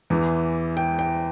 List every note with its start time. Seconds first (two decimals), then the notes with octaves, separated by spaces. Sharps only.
0.10 E2 E3
0.77 G5
0.99 G5